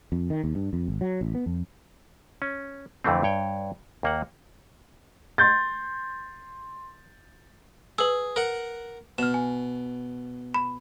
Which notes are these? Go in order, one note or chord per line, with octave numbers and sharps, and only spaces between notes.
F2
D#3
D#2
G2
F2
G#1
F#3
A1
B3
F2
C#4
F2 D3 E3 A3 C4
G2 C#5 G5
D#2 A#3 F#5
C6 G6 A6
G#4 B4 E6
A#4 F#5
B2 F6 E7
G#5
B5